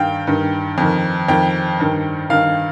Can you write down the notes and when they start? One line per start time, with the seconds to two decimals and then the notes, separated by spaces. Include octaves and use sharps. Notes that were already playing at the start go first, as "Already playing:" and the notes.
Already playing: G2 D#3 F5 G5
0.27 G2 D#3
0.78 F2 D#3
1.28 F2 D#3 G5
1.80 G2 D#3
2.30 G2 D#3 F5